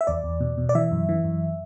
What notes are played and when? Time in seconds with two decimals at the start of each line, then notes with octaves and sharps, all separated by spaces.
0.01 E5
0.07 E2 D5
0.24 E2
0.40 B2
0.58 B2
0.69 D5
0.75 E3 E5
0.91 F#2
1.09 E3
1.24 F#2